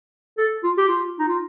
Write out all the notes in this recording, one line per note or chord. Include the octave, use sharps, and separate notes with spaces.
A4
F4
G4
F4
D#4
F4